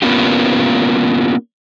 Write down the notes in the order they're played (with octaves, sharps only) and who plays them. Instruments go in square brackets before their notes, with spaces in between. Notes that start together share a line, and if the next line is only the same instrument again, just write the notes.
[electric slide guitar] A#3 B3 C#4 F4 G4